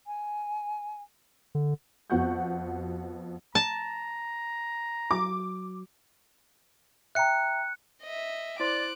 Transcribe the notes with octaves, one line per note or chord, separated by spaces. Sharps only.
G#5
D3
F2 B3 F#4 F#5 C#6 G6
A5 A#5
F#3 D6
E5 G5 A#5 F#6 C#7
D#5 E5
E4 C5 D5 C6 D6 F#6